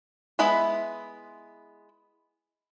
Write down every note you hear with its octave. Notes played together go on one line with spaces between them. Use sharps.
G#3 B3 E4 B4 E5